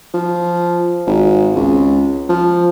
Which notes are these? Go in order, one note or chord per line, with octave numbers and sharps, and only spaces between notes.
F3
G#1
C#2
F3